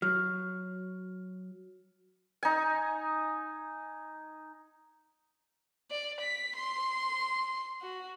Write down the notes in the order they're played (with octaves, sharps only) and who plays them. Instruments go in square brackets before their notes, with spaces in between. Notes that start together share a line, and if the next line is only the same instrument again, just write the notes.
[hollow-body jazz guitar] F#3 [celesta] F6
[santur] D#4 G#5
[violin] D5
B6
C6
F#4